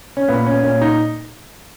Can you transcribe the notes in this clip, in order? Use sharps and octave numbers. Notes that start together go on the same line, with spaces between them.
C#4
A#2 B3
C#4
A#2 C#4
D#4